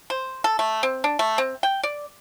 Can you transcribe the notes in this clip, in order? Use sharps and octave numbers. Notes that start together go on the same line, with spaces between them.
C5
A4
A3
C4
D4
A3
C4
G5
D5